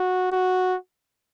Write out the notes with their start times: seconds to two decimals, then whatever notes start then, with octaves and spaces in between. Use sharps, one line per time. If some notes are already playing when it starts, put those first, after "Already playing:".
Already playing: F#4
0.32 F#4